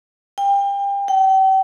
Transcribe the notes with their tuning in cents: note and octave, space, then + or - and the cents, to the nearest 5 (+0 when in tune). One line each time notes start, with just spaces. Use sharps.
G5 +30
G5 -40